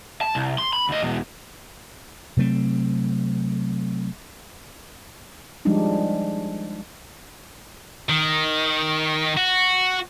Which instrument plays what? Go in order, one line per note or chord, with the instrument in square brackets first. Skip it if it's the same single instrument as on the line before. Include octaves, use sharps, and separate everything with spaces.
[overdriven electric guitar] A5
C2
C6
B5
D2 D#5
E2 B2
[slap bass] C3 F#3 A3 C4
[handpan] F3 G3 G#3 D4 D#4
[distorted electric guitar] D#3
F#4